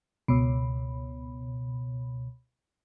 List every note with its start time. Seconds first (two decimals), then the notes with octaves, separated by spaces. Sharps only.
0.28 C#2 B2